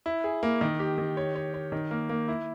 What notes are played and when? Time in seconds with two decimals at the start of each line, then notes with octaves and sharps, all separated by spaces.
0.06 E4
0.24 G#4
0.43 A#3
0.61 D#3
0.79 G4
0.98 D#3
1.17 C#5
1.35 C#5
1.54 C#5
1.72 D#3
1.91 A#3
2.09 A#3
2.28 E4